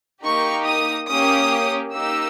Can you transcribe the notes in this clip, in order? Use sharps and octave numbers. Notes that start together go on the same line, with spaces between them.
A#3 D#4 G4 C#6
D#6
A#3 C#4 G4 D#6
A#3 D#4 G4 E6